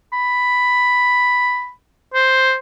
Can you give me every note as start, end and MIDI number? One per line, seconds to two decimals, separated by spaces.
0.13 1.71 83
2.14 2.55 72